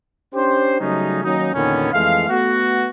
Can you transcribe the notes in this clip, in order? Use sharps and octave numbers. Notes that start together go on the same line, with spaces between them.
C#4 D4 G4 C5
C#3 F#3 G3 A3 C#4 D#4
D#3 F#3 A#3 C#4 D#4
E2 A#2 D3 D#3 B3 C#4
F2 E3 G#3 A3 F5
A3 B3 F#4